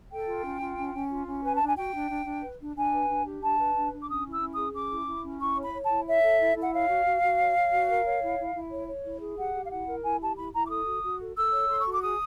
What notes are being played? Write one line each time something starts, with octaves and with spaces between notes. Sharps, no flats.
A4 G5
F4
C#4
F4
C#4
C#4
F4
C#4
B4 G#5
A5
D4
G#5
F#4 G5
D4
D4
D4
B4
D4
D4 G#5
B4
D4
G4
D4 A5
B4
D4
D4
D6
C#4 D#6
E4
E6
C#4
D#6
G#4
C#4 D6
E4
E4
C#4
E4 C#6
C#5
B5
C#5
A5
E4
C#5 E5
A4
E4
E4
F#5
C#5 F5
F#4
F#4
F#4
C#5
C#5
F#4
A#4
C#5
E4
E4
E4
C#5
C#5
E4
G#4
G4 F#5
G4
F5
E4 F#5
A#4
E4 G#5
G4 A5
E4 B5
E4 A#5
D6
A4 D#6
F#4
F#4
A4
A4 E6
C#5
A4 C6
C#6
F#4
D6
G#4 D#6